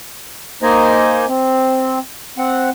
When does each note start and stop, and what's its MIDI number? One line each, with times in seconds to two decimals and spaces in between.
0.63 1.26 58
0.63 1.26 63
0.63 1.26 72
0.63 1.26 75
0.63 1.26 80
1.29 1.99 60
2.38 2.70 60
2.38 2.70 78